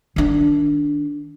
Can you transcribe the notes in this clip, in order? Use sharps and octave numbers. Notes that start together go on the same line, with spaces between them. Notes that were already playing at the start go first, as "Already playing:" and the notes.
D#3 D4